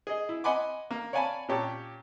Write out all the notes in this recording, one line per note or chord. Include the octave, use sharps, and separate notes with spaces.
G#4 D#5
E4
D#5 F#5 G#5 B5 C6 D6
A#3
C#5 D5 F5 G#5 A5 B5
A#2 C#4 G4 C#5 A5